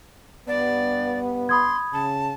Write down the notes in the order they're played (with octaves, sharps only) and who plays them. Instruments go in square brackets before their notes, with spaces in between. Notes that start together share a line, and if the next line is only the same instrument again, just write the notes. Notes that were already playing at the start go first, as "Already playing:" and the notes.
[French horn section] G2 B3 [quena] D5
[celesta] B5 D#6 G#6 [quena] C6
[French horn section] C#3 [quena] A5